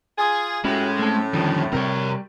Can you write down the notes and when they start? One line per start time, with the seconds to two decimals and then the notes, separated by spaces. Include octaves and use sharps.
0.18 F4 G#4
0.64 A2 G#3 C#4 E4 F#4 G4
0.99 A3 C4 A4
1.33 F2 D3 D#3 F3 G3
1.73 C3 G3 C4 A#4 C#5